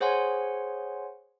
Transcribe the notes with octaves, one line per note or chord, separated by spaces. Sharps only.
G#4 C5 C#5 F#5 G#5 C6